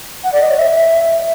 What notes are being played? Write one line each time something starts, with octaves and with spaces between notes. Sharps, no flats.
F#5
D5
D#5
C#5
E5